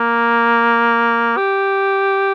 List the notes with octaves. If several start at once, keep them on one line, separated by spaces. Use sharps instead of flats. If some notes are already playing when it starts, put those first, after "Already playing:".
Already playing: A#3
G4